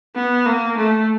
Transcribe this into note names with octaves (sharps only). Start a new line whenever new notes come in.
B3
A#3
A3